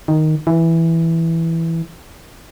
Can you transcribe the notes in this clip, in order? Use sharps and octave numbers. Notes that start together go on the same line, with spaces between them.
D#3
E3